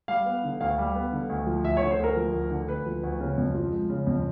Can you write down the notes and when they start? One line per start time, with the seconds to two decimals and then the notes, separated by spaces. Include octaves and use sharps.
0.08 G3 F5
0.26 B3
0.44 D3
0.61 D2 F5
0.78 G3
0.96 B3
1.12 D3
1.30 D2
1.47 F3
1.64 D2 E5
1.77 C#5
1.82 D3
1.91 C5
1.99 D2 A#4
2.16 F3
2.33 D2
2.51 D3
2.68 D2 B4
2.86 F3
3.03 D2
3.20 C#3
3.37 F2
3.55 F3
3.73 G#3
3.90 C#3
4.07 F2